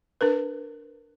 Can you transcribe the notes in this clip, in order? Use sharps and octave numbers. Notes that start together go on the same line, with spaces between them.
D4 A#4 B4